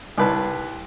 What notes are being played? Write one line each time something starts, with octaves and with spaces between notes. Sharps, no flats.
C2 B4 A5